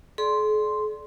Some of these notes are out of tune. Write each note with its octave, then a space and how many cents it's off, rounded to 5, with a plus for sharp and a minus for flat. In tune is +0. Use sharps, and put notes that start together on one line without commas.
G#4 +45 D5 +0 C6 +0